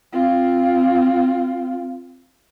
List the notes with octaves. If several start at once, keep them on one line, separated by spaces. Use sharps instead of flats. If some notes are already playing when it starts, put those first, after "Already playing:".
C4 F4